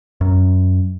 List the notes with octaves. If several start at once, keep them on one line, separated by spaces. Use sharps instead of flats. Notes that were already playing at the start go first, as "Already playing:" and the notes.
F#2